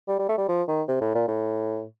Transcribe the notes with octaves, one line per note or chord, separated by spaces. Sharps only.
G3
G3
A3
G3
F3
D#3
C3
A2
A#2
A2